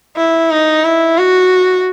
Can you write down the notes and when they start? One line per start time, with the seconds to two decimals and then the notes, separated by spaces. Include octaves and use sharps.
0.17 E4
0.51 D#4
0.85 E4
1.18 F#4